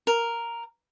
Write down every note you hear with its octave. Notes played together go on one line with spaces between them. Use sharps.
A#4